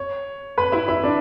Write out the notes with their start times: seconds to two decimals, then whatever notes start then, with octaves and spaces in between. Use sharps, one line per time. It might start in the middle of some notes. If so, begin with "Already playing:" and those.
Already playing: C#5
0.58 B4 B5
0.72 E4 E5
0.88 E4 E5
1.03 D4 D5